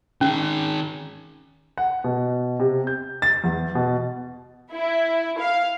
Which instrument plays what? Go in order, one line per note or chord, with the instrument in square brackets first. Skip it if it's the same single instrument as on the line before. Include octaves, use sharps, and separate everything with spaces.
[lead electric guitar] D#3 G#4 [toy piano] C#4
[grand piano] F#5
B2
C3
G6
A6
E2
B2
[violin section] E4
F5